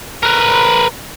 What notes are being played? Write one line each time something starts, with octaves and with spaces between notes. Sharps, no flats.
A#4 B4